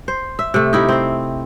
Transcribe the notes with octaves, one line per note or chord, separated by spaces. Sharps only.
C5
E5
C3 A3
D#4 E4 G4
C4 C5